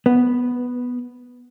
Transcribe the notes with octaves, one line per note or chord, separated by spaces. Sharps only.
B3